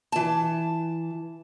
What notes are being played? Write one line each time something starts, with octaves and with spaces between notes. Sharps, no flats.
E3 A5